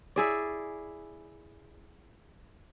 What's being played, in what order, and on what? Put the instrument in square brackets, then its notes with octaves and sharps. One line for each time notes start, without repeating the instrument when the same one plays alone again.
[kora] E4 G#4 D5